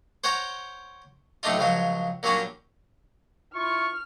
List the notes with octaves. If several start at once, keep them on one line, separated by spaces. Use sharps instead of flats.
C5 C#5 F#5 G5 A#5
B1 A2 A3 D4 D#4 F4
C#2 C#3 F3 F#3
A#2 F#3 G3 C#4 D4 F#4
E4 F4 C#6 F6